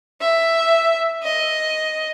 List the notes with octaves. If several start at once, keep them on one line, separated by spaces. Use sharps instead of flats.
E5
D#5